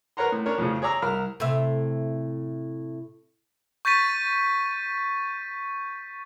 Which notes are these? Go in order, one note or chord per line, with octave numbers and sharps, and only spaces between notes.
A#4 B4 C#5 F#5 A#5 C6
A2
C#4 D4 A#4 C#5
F2 A2 C#3 F3
G#4 C#5 D5 A#5 E6
C2 A#4 B5 F6
A2 C3 E5
C#6 G6 A6 B6 D#7